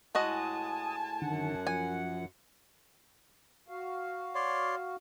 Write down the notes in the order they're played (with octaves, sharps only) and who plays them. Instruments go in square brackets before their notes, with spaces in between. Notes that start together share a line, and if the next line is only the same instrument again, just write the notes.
[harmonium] A2 [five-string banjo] G#3 F#4 D#5 [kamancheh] G#5 A5 [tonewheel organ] D#6
[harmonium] F#2 F#5 [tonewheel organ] D3 D#3
[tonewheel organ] F3 [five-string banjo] G#5
[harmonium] F#4 F5
[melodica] C#5 D5 C6